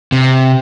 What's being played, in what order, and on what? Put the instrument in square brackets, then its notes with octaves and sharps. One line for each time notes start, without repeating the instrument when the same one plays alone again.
[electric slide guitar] C3